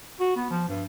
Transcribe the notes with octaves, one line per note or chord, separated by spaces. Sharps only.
F#4
B3
F3
G2